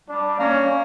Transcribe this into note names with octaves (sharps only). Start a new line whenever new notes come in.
G3 D4
A#3 C#4